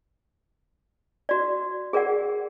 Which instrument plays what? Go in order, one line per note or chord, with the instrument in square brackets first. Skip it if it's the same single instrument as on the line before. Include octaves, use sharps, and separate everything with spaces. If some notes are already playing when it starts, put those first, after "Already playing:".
[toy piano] F#4 D5
G#4 A#4 D5 F#5